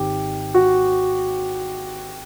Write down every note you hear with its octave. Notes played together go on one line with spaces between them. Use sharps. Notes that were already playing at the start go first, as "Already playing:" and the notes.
Already playing: G#1 G#2 D#3 G4
F#4